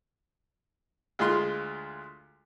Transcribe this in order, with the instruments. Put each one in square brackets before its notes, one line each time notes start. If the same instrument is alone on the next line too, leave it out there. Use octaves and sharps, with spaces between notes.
[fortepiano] D2 G#3 F4 C6